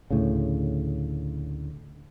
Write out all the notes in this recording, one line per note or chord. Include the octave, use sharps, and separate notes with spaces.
D2 A2 C#3